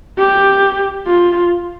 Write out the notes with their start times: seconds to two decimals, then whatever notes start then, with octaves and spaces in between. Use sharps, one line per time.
0.18 G4
1.07 F4